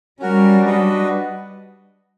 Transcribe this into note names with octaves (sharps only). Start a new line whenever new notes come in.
G3 C#4 F#4 A#4
D4 F#4 B4 D#5